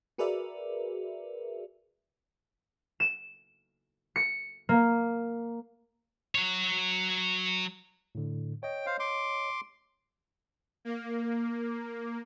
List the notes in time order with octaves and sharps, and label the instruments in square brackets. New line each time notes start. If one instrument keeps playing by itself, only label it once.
[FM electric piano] F#4 G#4 A#4 B4 D5 E5
[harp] E7
C#7
A#3
[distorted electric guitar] F#3 C#5
[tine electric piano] A2 D3
[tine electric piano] C#5 D#5 [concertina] G5
[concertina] C5 F5
C6 D6
[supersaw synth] A#3